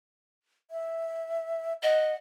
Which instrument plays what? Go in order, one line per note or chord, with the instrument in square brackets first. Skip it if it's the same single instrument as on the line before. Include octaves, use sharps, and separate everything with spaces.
[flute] E5
[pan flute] D#5 [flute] F#5